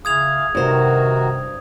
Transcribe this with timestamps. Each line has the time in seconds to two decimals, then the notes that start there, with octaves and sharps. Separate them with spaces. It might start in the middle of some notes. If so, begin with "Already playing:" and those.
0.05 C#3 E4 G#4 F5 D#6 G#6 F7
0.55 G2 C3 D#3 F#4 A#4 C5